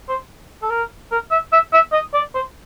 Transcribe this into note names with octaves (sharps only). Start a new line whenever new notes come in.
C5
A4
A#4
A#4
E5
E5
E5
D#5
D5
C5